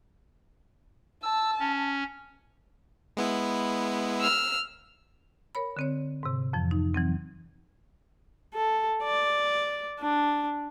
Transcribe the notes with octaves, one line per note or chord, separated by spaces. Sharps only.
A5 E6
C#4
G#3 B3 E4
E6 F6
A#4 C#5 B5
D3 C4 C#5
G#2 C3
F2 E3 F3
D#4
E3 F#3 C4
A4
D5
D4